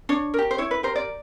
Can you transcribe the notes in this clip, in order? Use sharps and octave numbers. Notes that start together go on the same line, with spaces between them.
D4 C#5
G4 A#4
C5
E4 C#5
B4
G4 A#4 C5
D5